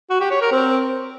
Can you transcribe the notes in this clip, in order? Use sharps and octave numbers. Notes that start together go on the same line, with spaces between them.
F#4
G4
C#5
A#4
C4